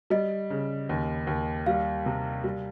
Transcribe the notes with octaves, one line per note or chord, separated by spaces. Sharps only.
G3 D#5
C#3
D#2
D#2
G3 F5
C3
G3